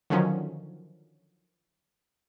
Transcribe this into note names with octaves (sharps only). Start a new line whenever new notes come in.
D3 D#3 F3 F#3 C#4